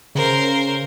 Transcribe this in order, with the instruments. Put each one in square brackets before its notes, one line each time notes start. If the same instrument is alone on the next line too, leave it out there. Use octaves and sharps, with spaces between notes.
[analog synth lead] C#3 [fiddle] A#4 C5